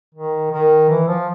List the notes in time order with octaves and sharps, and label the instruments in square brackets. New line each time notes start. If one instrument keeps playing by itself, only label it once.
[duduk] D#3
D#3
E3
F3